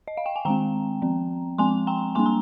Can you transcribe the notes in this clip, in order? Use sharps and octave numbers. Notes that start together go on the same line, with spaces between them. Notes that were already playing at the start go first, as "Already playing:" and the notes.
D#5
F5
G5
G#5
D#3 G#3 C4 G5 A#5
F3 C4
F3 G#3 C4 G#5 C6
G5 A#5
G3 A#3 D4 G#5 C6
A#5